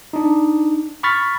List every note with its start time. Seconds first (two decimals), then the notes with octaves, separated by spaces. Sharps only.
0.13 D4 D#4
1.03 B5 C#6 F6 A6 B6